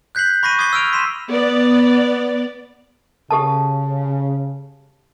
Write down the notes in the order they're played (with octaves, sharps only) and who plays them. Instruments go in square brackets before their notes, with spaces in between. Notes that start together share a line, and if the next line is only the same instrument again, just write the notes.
[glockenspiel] F#6 G6 B6 C7 F#7
B5 C#6 A#6 C7 D#7
D6 D#6 G#6 B6 C7 G7
E6 F6 D7 F7
C6 B6 D#7 E7
[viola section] B3 D5
[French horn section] C#3 [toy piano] G4 A4 A5